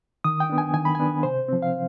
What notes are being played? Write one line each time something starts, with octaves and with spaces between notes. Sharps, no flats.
D#3 D#6
G5
B3 D4
G#5
D#3 G#5
B5
B3 D4 G#5
C3 C5
F3 C4
F5